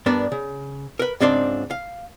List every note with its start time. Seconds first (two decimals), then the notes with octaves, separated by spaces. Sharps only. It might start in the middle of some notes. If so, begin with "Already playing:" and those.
0.06 G2 B3 D4 A#4 D5
0.32 C#3
0.99 A#4 B4
1.20 C#2 G#2 C4 D4 D5 C6
1.71 F5